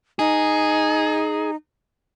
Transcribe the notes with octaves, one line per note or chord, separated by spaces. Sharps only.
D#4 G#4